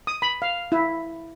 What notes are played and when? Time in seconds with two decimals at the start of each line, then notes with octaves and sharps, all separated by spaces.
0.07 D#6
0.22 B5
0.42 F5
0.72 E4